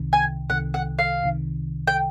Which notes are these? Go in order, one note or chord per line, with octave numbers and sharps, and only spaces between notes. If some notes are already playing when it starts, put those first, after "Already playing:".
Already playing: C2 C3 D#3
G#5
C2 C3 D#3 F#5
F#5
F5
C2 C3 D#3
G5